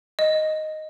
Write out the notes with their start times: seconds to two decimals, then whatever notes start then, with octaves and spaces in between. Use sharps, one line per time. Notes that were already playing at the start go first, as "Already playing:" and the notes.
0.19 D#5